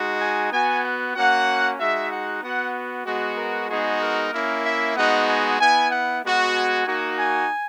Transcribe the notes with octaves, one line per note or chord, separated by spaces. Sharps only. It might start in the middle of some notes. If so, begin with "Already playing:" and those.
Already playing: G#3 D#4 F#4
G#5
B3 F#4 G#5
F#5
A#3 C#4 F#4 F#5
G#3 D#4 F#4 E5
F#5
B3 F#4 F#5
G#3 B3 F#4
A#4
G#3 B3 D#4 F#4 G#4
A#4
A#3 C#4 E4
E5
G#3 B3 D#4 F#4 F#5
G#5
B3 E4 G#5
F#5
G#3 B3 F#4
G#5
A#3 D#4 F#4
G#5